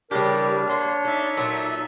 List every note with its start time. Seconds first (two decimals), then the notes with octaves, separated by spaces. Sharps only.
0.11 C#3 E3 G3 D4 G4 A#4
0.70 A#3 C#5 C6
1.05 D#4 A4 E5
1.37 A#2 F#3 A4